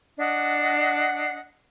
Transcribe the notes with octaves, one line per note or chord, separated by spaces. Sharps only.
D4 D#5 F#5